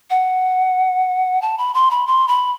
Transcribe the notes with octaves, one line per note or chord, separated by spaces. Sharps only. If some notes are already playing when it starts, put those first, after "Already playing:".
F#5
A5
B5
C6
B5
C6
B5